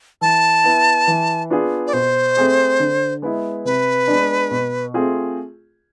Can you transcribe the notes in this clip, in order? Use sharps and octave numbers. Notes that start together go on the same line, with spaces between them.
E3 A5
B3 E4
E3
B3 D4 F4 G#4
D5
B2 C5
A3 C4 G#4
D3
G#3 B3 E4
C3 B4
G#3 B3 D4
B2
A3 C4 F4 G#4